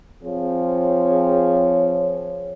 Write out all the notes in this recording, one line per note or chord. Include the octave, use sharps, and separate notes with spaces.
F3 C4 G#4 C#5